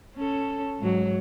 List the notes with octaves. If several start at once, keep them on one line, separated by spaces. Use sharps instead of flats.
C#4 A4
G#2 F#3